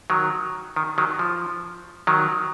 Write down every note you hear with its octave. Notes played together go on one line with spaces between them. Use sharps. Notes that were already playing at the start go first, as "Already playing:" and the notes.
D#3 F#3
D#3
D#3 F#3
F3
D#3 F#3